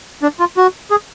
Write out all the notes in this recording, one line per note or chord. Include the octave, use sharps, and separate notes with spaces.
D4
F4
F#4
G#4